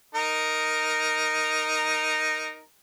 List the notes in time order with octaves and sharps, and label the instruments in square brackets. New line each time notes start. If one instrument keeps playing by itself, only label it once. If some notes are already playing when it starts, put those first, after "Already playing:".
[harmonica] D#4 A#4